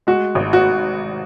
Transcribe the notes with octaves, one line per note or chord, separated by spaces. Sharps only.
G#3 F#4
G#1
F#4